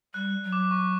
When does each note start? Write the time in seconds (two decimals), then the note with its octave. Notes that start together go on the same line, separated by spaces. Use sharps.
0.14 G3 F#6
0.44 F#3
0.52 D6
0.71 C#6